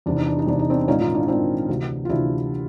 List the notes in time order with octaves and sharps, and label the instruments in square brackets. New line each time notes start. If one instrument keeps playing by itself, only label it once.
[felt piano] E2 C3 E3 D4
D#4
D4
D#4
E2 C3 E3 D4
D#4
C4 D4
A#1 G#2 D#3 C#4 D#4
D#4 F4
D4 E4
A#1 G#2 D#3 C4 D4
D2 C3 E3
F4
D2 C3 E3 D4 E4